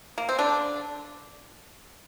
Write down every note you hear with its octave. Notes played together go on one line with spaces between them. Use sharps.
A#3
C4
D3 D4